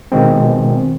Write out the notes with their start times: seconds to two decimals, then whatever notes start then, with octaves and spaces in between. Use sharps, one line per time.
0.12 B2 D#3 G#3 C4